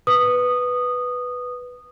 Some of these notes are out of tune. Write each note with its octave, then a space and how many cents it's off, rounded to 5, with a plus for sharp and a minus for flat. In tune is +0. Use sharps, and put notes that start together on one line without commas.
B4 +0 D#6 -15